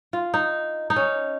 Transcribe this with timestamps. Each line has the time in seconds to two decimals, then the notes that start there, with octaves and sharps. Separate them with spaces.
0.13 F4
0.34 D#4
0.90 D#4
0.96 C#4